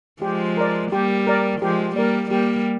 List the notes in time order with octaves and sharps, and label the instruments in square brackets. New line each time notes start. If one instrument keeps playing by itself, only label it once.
[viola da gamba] F3 G#3 [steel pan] G4
[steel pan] A#4 D5
[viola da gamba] G3 A#3 [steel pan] G4
[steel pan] A#4 D5
[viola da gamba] F3 G#3 [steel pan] G4
[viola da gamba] G3 A#3 [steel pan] A#4 D5
[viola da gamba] G3 A#3 [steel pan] G4